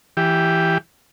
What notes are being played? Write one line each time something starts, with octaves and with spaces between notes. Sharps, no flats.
E3 G4